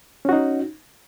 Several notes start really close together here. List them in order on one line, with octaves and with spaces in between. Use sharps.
C#4 F#4 D#4